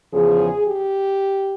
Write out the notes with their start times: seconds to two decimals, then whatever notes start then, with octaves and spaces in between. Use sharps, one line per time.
0.13 E2 C#3 F3 G#4
0.65 G4